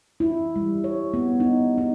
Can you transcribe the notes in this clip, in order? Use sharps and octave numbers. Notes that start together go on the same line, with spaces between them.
E4
G3
C#5
B3
D#4
D#4